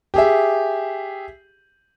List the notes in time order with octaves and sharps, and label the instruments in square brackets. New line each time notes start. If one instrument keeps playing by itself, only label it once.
[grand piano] G4 G#4 E5